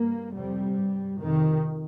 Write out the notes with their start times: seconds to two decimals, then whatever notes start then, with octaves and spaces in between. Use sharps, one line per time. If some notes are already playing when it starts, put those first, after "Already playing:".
Already playing: G2 A#3
0.35 F2 C3 G3
0.77 G2
1.19 F2 C3 D#3